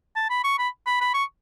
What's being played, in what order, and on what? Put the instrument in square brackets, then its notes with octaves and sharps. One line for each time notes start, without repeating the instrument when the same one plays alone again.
[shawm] A5
B5
C#6
B5
B5
B5
C#6